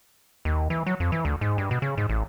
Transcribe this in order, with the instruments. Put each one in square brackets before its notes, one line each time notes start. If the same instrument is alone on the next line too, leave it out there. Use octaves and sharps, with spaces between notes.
[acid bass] D#2
E3
F#3
F2
E3
D2
G#2
G2
B2
C#3
G#2
A1